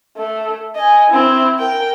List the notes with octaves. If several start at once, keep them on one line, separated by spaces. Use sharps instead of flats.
A3
D#5 G#5
C4 E4
A#4 G5